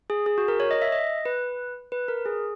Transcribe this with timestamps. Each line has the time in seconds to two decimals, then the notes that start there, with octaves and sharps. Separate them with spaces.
0.10 G#4
0.26 G#4
0.38 F#4
0.48 A#4
0.60 C#5
0.71 D#5
0.82 E5
0.92 D#5
1.25 B4
1.92 B4
2.08 A#4
2.26 G#4